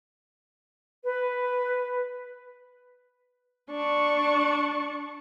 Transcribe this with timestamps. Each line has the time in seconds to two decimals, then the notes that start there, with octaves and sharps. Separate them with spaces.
1.04 B4
3.71 D4 C#6